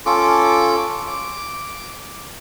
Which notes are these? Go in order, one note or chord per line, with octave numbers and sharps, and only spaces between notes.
C#4 F4 A4 D6
D6